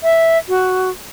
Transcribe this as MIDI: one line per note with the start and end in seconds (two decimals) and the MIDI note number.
0.04 0.38 76
0.49 0.90 66